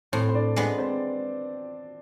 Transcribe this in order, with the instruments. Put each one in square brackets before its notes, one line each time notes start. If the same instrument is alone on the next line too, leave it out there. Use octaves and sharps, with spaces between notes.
[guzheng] A2 [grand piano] C4 C5
[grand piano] C5
D4 D5
[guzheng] G#3 B3 [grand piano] D4 D5
[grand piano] C4 C5